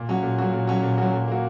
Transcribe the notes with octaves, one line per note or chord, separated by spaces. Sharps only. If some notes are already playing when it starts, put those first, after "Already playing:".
Already playing: A#2
F#3 C#4 F#4
A#2
F#3 C#4 F#4
A#2
F#3 C#4 F#4
A#2
F#3 C#4 F#4
A#2
A#3 F#4